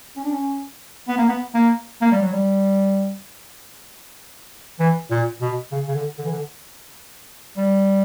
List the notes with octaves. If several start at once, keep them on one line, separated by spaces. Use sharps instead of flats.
C#4
D4
C#4
B3
A#3
B3
A#3
A#3
G3
F#3
G3
E3
A#2
B2
C#3
C#3
D3
D3
E3
D3
G3